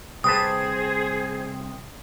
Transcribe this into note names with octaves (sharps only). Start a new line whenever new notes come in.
C2 C4 G4 G#4 B4 C5 A5 D#6